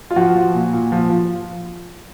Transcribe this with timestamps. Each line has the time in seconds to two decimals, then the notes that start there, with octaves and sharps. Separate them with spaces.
0.11 F4
0.16 F3 F#4
0.35 F3
0.54 A#2
0.73 A#2
0.92 F3
1.10 F3